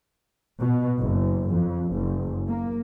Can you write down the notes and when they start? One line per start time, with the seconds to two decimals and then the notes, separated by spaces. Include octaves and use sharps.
0.60 B2
0.99 F#1
1.51 F2
1.92 F#1
2.48 A#3